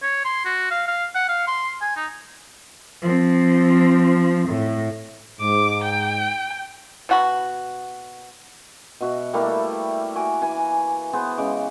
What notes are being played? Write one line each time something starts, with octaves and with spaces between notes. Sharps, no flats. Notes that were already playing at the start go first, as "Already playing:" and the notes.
C#5
C6
F#4
F5
F5
F#5
F5
C6
G#5
D#4
F3 C4
A2
G#2 D6
G5
B2 F#4 B5
B2 F#4 E5
G3 A3 A#3 E4
F#4 G#5 D6
E3 G#5
B3 G#4 C5
C#3 G#3 D6